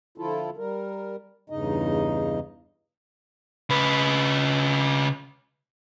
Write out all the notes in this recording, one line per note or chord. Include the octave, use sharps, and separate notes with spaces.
D3 F3 E4 F4 A4
G3 A#4
E2 G2 C#3 D#4 D#5
C#3 B4